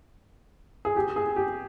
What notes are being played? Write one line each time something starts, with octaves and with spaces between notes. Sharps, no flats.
G#4
G4
G#4
G4